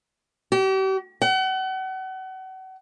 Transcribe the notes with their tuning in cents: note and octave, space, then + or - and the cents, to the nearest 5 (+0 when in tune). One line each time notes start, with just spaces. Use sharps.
G4 -40
F#5 +35